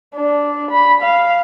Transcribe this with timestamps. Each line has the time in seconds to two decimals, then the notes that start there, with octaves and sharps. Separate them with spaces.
0.16 D4
0.71 B5
1.02 F5